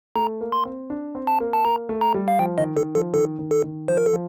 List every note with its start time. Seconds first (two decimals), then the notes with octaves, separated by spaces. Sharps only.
0.15 A3 A#5
0.41 A#3
0.52 C6
0.65 C4
0.90 D4
1.15 C4
1.27 A5
1.40 A#3
1.53 A5
1.65 A#3 A#5
1.89 A3
2.01 A#5
2.14 G3
2.28 F5
2.39 F3 G5
2.58 D#3 D#5
2.76 D#3 A4
2.95 F3 A4
3.14 D#3 A4
3.39 D#3
3.51 A4
3.64 D#3
3.88 F3 C5
3.97 A#4
4.06 A4
4.13 F3